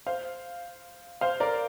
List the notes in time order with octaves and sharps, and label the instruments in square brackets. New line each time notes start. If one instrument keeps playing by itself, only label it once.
[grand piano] C5 F5
C5 F5
A#4 D5